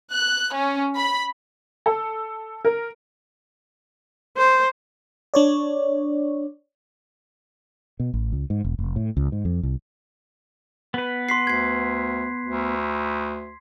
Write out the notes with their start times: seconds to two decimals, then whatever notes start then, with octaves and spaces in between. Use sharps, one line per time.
0.12 F#6
0.53 C#4
0.96 B5
1.86 A4
2.65 A#4
4.37 C5
5.34 D4 C#5 D5
8.00 B2
8.14 A1
8.32 C#2
8.50 G#2
8.64 E1
8.78 F1
8.96 A2
9.17 C#2
9.32 G#2
9.45 F2
9.63 C2
10.94 B3 B4
11.29 C6 B6 C7
11.47 D2 G#6 C7
12.46 D2